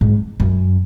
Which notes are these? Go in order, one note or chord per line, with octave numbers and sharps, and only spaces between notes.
G#2
F#2